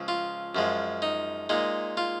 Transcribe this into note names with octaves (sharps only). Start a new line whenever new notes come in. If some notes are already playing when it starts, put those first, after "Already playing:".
Already playing: C#2 C#3 F3
F4
F#2 F3 G#3
D#4
A#2 G#3 D#4
F4